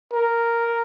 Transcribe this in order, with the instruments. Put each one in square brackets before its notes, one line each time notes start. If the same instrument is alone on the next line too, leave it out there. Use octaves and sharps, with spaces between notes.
[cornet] A#4